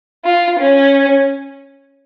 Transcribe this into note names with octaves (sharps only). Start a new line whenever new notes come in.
F4
C#4